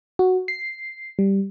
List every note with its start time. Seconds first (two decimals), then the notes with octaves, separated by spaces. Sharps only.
0.19 F#4
0.48 C7
1.19 G3